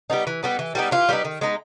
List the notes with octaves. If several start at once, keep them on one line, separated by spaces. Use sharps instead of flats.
G3 B3 D#4
E3
G3 B3 D#4
E3
G3 B3 D#4
E3 F4
G3 B3 D#4
D#3
G#3 B3 D#4